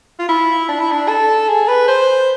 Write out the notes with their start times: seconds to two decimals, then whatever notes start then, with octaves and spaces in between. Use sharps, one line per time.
0.19 F4
0.29 E4
0.68 D4
0.80 E4
0.92 D4
1.09 A4
1.48 G#4
1.68 B4
1.88 C5